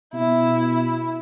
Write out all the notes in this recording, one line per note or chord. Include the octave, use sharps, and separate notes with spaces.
B2 E4